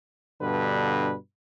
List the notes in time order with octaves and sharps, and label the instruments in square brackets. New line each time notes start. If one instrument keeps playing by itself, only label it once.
[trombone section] G2 B2 D3 B4